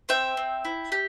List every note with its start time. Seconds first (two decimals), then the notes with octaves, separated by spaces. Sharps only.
0.09 C4 E5 G5
0.37 C4
0.65 E4
0.92 G4